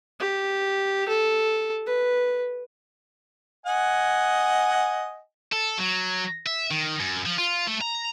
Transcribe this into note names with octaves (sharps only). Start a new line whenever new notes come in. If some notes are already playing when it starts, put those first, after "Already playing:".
G4
A4
B4
D#5 F#5 G#5
A4
F#3
E5
D#3
F#2
F3
F4
A3
A#5